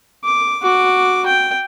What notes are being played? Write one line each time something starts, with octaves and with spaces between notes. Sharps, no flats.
D6
F#4 D6
G5